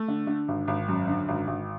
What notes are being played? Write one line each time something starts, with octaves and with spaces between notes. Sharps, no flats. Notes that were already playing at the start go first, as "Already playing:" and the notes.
Already playing: A3
D3
D3
G#1
G#1
F#2
D3
G#1
G#1